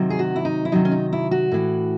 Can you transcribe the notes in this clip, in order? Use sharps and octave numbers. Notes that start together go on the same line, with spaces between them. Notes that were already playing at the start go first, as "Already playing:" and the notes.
Already playing: C3 D#3 F#3
G#4
F#4
E4
D#4
E4
C3 D#3 F#3 D#4
C#4
D#4
E4
F#4
A2 E3